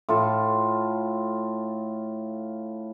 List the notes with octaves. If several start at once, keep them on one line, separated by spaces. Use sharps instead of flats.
A2 F4 A4 A5